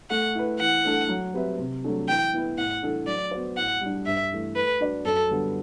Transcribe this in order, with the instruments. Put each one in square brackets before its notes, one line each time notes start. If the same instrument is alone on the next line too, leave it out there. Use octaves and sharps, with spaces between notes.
[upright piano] A3 [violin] F#5
[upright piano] E4 B4
[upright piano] E3 [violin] F#5
[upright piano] A3 D4 A4
F#3
C4 G4 B4 E5
C3
F#3 A3 D4 A4
[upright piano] E3 [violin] G5
[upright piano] B3 E4 B4
[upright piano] A2 [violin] F#5
[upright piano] E3 A3 D4 A4
[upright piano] F#3 [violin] D5
[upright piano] B3 F#4 C5
[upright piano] A2 [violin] F#5
[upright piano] G3 D4
[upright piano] G2 [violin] E5
[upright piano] E3 A3
[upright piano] A3 [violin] B4
[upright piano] D4 F#4 B4 D5
[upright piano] F#2 [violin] A4
[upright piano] D3 G3 B3